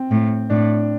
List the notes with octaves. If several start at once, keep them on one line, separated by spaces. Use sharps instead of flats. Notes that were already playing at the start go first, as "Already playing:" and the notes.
Already playing: C4
A2
A2 D4